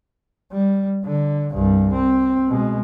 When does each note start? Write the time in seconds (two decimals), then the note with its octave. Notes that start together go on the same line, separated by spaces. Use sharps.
0.52 G3
1.05 D3
1.52 C2 G2
1.93 C4
2.48 B2 G#3